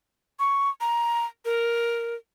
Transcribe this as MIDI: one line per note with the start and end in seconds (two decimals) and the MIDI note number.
0.39 0.69 85
0.81 1.25 82
1.45 2.15 70